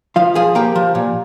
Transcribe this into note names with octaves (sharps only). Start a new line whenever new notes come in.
F3 F4 F5
F3 G#4 G#5
A#3 G4 G5
F3
A#2